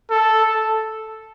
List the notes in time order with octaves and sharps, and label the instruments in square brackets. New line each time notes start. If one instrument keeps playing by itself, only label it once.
[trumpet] A4